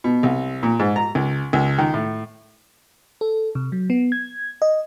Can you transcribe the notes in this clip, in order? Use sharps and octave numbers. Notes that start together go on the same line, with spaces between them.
B2
C2
A#2
G#2
A#5
C#2
C#2
D#3
A2
A4
C3
F#3
B3
G#6
D#5